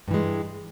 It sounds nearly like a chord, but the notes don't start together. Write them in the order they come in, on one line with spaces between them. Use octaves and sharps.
G2 E3 G#3